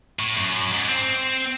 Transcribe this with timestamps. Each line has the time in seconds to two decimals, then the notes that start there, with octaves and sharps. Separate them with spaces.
0.19 A2
0.37 F#2
0.73 G#2
0.89 C4